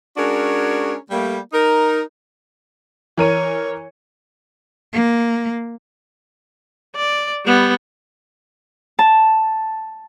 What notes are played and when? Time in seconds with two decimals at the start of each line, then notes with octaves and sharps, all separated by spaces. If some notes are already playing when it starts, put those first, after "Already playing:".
0.17 G#3 C#4 D4 F#4 G#4 A#4
1.11 G3 A3 A#3
1.53 D#4 A#4
3.18 E3 A#4 C#5 D#7
4.93 A#3
6.96 D5
7.46 G3 B3
8.99 A5